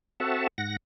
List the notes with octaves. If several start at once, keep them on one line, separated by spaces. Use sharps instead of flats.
C4 F#4 A4 E5 F#5 A5
G#2 F#5 A#6